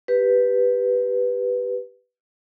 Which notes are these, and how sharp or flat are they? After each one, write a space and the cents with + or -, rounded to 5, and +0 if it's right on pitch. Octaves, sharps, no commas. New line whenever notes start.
G4 +0 B4 +0